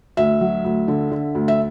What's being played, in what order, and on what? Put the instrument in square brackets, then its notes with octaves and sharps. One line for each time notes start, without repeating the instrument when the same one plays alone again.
[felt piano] D2 E5
F#3
D2
D3
D3
D2
E5